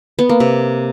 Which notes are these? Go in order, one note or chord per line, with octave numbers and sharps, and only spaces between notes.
B3
A#3
C3